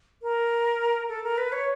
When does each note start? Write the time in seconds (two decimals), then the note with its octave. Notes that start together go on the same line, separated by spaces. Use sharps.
0.23 A#4
1.09 A4
1.24 A#4
1.38 B4
1.52 C#5